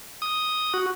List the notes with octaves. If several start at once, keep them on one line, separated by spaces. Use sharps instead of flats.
D#6
F#4